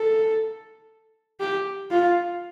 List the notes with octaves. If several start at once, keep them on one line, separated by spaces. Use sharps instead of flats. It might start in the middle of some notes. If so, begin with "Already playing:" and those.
Already playing: A4
G4
F4